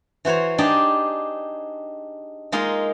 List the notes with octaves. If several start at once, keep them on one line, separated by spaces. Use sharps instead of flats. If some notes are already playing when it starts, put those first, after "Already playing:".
E3 F#4 C5 C#5 A#5
D4 D#4 G4 G#4 D5
G#3 A#3 D#4 F4 A#4